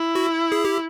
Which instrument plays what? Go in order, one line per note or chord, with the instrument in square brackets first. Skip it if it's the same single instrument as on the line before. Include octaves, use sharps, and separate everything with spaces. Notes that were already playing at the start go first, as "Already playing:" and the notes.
Already playing: [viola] E4
[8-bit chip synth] F#4
G#4
G4